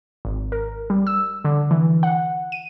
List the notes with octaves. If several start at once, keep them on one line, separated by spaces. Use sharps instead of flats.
G#1
A#4
G3
E6
D3
E3
F#5
D#7